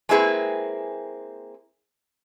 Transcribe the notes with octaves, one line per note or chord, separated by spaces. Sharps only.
G#3 A#3 C4 E4 G#4 B4